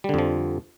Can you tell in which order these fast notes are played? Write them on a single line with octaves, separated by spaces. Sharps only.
G3 D3 F2 F3